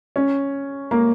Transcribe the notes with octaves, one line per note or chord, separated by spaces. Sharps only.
C#4
A#3